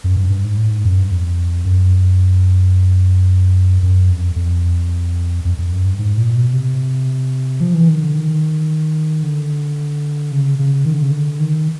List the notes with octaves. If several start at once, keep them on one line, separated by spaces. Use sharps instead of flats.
F#2
G2
G2
G#2
A2
G#2
F#2
G2
F2
F#2
F#2
F2
F2
F2
F2
F#2
G2
G#2
A#2
B2
C3
F3
E3
D#3
D3
D#3
D3
C#3
C#3
D#3
D3
C#3
D3
D#3